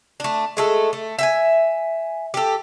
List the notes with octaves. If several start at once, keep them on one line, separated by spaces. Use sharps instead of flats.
A3 D4
G#3 A3 A4
A3
E5 G5 G#5
G4 A4